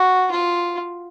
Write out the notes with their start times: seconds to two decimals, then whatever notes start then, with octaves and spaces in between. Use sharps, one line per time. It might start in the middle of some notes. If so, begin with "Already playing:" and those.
Already playing: F#4
0.31 F4